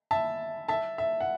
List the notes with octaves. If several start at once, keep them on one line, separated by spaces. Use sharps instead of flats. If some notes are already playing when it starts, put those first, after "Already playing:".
E5 A5
E5 A5
E5
F#5